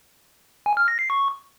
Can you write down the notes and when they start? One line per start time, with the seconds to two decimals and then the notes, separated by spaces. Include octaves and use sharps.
0.66 G#5
0.77 F6
0.88 A#6
0.99 C7
1.10 C#6